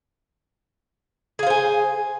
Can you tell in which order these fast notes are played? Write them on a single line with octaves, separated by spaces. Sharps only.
G#4 F5 C5 G#5